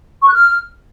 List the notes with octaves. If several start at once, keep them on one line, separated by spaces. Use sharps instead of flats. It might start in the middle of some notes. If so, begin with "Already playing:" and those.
C#6
F#6
F6